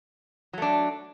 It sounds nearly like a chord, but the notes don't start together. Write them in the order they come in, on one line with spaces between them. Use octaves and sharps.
F#3 A3 D4